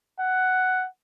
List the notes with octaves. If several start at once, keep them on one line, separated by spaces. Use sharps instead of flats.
F#5